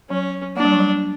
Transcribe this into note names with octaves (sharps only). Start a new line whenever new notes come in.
F#3 C#4
A#3 D4
G3
F#3
G3